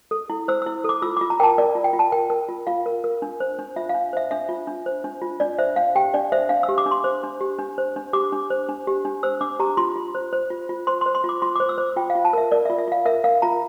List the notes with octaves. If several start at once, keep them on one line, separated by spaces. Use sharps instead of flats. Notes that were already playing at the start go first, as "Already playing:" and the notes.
A4
E4
C5 E6
E6
E4
A4 D6
F4 E6
D6
F4
A#5
A#4 G5 A5
A#4 D5
F4
G5
F4
A5
A#4 G5
A#4
F4
F4 F5
A#4
A#4
D4
C5
D4
F4 E5
F5
D4
C5 E5
D4 E5
F4
D4
C5
D4
F4
D4 D5
C5 E5
D4 F5
G4 G5
D4 D5
C5 E5
D4 F5
E6
G4
D6
D4
C6
C5
D4
G4
D4
C5
D4
G4 D6
D4
C5
D4
G4
D4
C5 E6
D4 D6
G4 A#5
F4 C6
F4
C5
C5
F4
F4
C5 C6
C6
C5
C6
F4 D6
F4 C6
D6
C5
E6
C5
F4 G5
F5
F4
A5
A#4 E5
A#4 D5
E5
F4
E5
F4 F5
A#4 E5
A#4 F5
F4 A#5